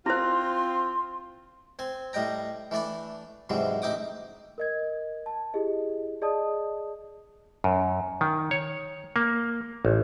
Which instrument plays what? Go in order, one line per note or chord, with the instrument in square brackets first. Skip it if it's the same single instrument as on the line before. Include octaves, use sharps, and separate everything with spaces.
[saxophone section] C4 F4 [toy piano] E4 C5 [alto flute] C6
[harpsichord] C4 G#5
A2 G3 D#5 G5 A#5
E3 A3 D4 D5 B5
G#2 C3 E3 F#3 G3
A1 D#4 E5 G5 D6 D#6
[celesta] A#4 D#5 G#6
A5
E4 G4 G#4 D#5
G#4 D5 D#5 A5 D#6
[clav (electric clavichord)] F#2
D#3
C#5
A#3
A1